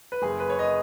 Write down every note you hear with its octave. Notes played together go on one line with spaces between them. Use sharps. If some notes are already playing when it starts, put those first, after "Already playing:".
B4
F#1 G#4
B4
C#5
D#5